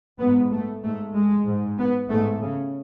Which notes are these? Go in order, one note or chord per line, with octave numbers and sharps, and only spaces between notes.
G#2 B3
A3
G#2 A3
G#3
G#2
B3
G#2 A3
C#3